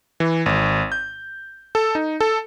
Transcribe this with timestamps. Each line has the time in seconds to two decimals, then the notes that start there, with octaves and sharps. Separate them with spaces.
0.20 E3
0.46 G#1
0.92 G6
1.75 A4
1.95 D#4
2.20 A4